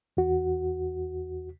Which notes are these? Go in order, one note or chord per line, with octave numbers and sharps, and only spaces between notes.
E2 F#4